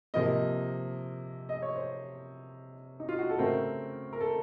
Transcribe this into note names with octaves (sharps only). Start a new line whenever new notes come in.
C3 F3 A#3 D#5
D#5
C#5
C5
D#4
F4
F#4
A4
C#3 A3 C4 A#4
A#4
A4